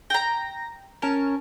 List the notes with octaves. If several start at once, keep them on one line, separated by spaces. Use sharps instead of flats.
G5 A#5 A#6
C#4 A#4 A5